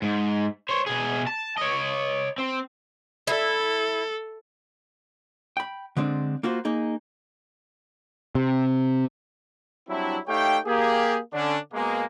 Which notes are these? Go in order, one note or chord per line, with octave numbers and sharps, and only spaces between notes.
G#2
C5 C#5
B2 G#4
A5
C#5 D#5
C4
E4 A4
G5 B5
D3 G#3 C4 D4
A#3 F4 F#4 C5
A#3 D#4 G#4
C3
F#3 G3 C4 D4 E4
A3 D#4 G4 C#5 F5 G5
A#3 G4 G#4
D3 C#4 D4
B2 G#3 A#3